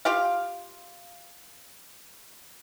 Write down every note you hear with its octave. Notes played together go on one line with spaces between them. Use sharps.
F4 G4 F5